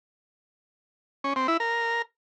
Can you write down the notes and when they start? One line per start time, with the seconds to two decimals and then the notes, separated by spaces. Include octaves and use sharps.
1.24 C#4
1.36 C4
1.48 E4
1.60 A#4